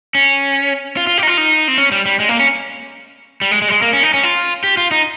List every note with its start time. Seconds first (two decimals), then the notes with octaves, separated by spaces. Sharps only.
0.15 C#4
0.97 F4
1.07 F4
1.18 G4
1.23 D#4
1.28 F4
1.38 D#4
1.68 C4
1.78 C#4
1.92 G3
2.06 G3
2.20 G#3
2.29 A#3
2.39 C#4
3.42 G3
3.51 G#3
3.62 G#3
3.68 G3
3.72 G#3
3.82 A#3
3.93 C#4
4.03 D#4
4.14 C#4
4.23 F4
4.64 G4
4.77 F4
4.91 D#4